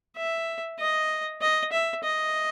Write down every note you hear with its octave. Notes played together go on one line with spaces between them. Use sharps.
E5
D#5
D#5
E5
D#5